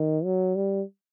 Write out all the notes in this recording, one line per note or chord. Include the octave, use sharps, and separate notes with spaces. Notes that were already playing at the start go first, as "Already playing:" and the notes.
Already playing: D#3
F#3
G3